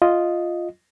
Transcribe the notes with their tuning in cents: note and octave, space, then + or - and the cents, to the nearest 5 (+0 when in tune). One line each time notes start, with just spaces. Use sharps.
F4 +0 D#5 +0